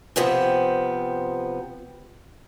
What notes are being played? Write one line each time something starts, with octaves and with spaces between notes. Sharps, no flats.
C3 F3 B3 C4